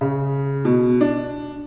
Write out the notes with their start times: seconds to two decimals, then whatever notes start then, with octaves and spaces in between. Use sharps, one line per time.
0.01 C#3
0.65 B2
1.01 D4